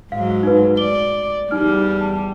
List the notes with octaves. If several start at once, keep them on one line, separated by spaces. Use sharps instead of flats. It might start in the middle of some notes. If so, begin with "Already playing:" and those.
G#2 F#3 F5
D#4 B4
D5 G7
E2 G3 D#4 F6
A5